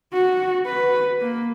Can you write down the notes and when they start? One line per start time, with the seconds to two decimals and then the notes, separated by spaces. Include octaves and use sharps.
0.13 F#4
0.67 B4
1.21 A#3